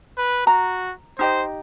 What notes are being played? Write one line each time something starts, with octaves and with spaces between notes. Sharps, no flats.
B4
F#4 A#5
D#4 G4 C5 D#5